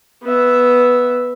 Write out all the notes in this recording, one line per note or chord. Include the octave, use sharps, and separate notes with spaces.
B3 E5